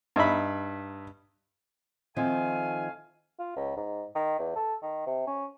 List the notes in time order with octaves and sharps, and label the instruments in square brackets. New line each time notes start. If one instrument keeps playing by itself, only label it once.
[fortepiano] G2 D#4 E5 B5
[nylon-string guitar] D#3 F3 C4 [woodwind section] A3 F5 G#5
[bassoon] F4
C#2
G#2
D#3
E2
A4
D#3
C3
C#4